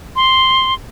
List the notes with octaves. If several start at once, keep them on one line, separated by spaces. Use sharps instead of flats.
C6